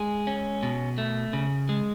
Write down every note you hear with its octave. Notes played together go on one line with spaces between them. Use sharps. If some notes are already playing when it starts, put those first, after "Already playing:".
Already playing: G#3 G#4
C#4
B2
A3
C#3
G#3